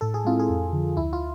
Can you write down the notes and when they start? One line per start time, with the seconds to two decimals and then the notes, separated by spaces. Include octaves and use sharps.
0.01 A2 A4
0.14 G#4
0.25 G#3 C4 E4 F4
0.40 G#4
0.49 F2
0.73 D3 F3
0.97 D2 E4
1.13 F4